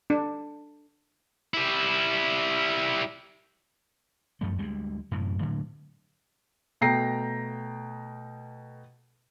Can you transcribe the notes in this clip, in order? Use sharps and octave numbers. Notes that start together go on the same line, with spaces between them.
D4
G3 E4
F#2 F3 A3
D2 G3 G#3
F#2 A2 C3 E3
A2 D3 F#3 G#3
B2 A3 G5 A#5 A#6 C7